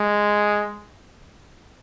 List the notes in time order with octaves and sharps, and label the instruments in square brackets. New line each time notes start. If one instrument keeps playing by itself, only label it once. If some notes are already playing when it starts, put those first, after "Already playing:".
Already playing: [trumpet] G#3